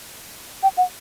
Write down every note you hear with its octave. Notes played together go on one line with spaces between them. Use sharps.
G5
F#5